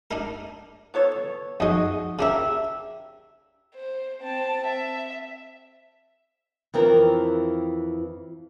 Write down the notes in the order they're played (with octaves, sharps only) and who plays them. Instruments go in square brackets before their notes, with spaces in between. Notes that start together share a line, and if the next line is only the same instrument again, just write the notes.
[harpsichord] D4 D#4 A#4
[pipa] B3 A4 C#5
[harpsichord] F2 G#3 [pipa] D#4 F#4 D#5
[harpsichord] C#3 D4 A#4 [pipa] G4 E5
[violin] C5
C4 A5
E5
[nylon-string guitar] F2 E3 C4 A#4